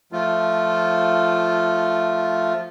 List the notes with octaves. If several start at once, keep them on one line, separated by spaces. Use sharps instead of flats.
F3 A3 F4